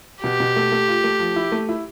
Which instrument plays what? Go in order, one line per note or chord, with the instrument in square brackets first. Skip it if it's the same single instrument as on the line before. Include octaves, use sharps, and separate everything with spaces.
[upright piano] B2 [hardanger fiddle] G4
[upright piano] B2
A3
A3
F4
A3
F3
E4
A3
E4